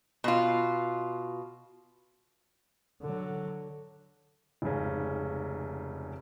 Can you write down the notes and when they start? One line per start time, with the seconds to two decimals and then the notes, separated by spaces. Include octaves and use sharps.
0.24 B2 F4
3.02 D3 F#3
4.62 F1 G#2 C#3 C#4